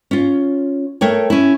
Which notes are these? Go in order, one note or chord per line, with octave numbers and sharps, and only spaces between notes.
C#4 F4
A3 A#4 C#5 G5
C#4 E4